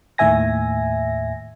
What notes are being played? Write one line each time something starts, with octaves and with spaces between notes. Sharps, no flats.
D#2 A2 D#3 E5 G#5 A#6